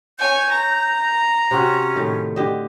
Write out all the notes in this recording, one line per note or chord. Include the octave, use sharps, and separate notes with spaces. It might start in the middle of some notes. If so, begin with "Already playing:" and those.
C#5 G#5 G6
A#5
C3 C4 C#4 F#4
A2 D#3 A3
D3 G4 D#5